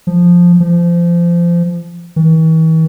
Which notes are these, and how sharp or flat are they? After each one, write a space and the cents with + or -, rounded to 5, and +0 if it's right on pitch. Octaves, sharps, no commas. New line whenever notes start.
F3 +5
F3 -25
E3 -45